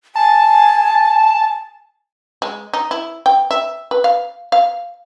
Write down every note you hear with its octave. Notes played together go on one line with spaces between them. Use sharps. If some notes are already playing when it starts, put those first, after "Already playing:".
G#5 A5
G#3
D#4
E4
G5
E5
B4
F5
F5